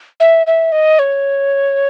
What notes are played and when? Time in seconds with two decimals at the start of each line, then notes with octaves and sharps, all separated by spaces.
0.20 E5
0.47 E5
0.72 D#5
0.99 C#5